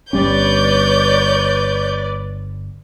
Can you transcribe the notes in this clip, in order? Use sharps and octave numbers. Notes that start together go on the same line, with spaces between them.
G1 G3 C#4 B4 C#5 D5 G6